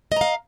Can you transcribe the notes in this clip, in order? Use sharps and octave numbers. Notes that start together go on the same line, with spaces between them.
D#5 F5 A#5